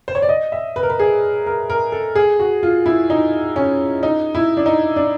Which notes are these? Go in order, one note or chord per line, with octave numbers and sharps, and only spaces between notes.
C5
C#5
D5
D#5
E5
B4
A#4
B4
G#4
A#4
A#4
A4
G#4
F#4
F4
E4
D#4
C#4
D#4
E4
D4
D#4
D4